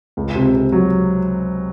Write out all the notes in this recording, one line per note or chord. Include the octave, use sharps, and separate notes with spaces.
C#2
C3
C3
F#3